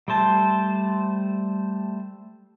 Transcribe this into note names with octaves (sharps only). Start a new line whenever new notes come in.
G3 A3 C5 A5